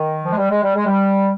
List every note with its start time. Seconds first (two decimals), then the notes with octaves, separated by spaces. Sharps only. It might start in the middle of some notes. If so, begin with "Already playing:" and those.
Already playing: D#3
0.24 F3
0.32 G#3
0.37 G3
0.50 G#3
0.63 G3
0.75 G#3
0.86 G3